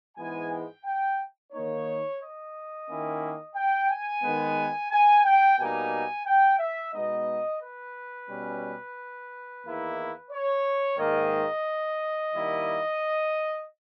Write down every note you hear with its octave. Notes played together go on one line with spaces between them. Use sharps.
G#2 E3 G#3 B3 G#5
G5
G5
D#3 A#3 D#4 C#5
D#5
D#3 A#3 C#4 E4
G5
G#5
D#3 G#3 B3
G#5
G5
B2 G3 A#3 D#4 G#5
G5
E5
B2 G#3 B3 D#4 D#5
B4
B2 G3 C#4
E2 D#3 A#3 E4
C#5
G#2 D#3 A#3 D#5
D#3 G3 A#3 E4